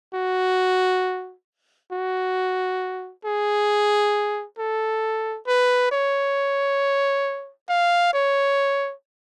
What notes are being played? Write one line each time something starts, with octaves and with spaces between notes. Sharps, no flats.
F#4
F#4
G#4
A4
B4
C#5
F5
C#5